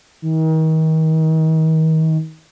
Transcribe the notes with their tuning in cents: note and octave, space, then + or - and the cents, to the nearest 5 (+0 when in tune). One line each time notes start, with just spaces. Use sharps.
D#3 +35